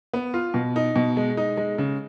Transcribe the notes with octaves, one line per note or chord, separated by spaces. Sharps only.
B3
F4
B2
D#4
B2
G#3
D#4
G#3
C#3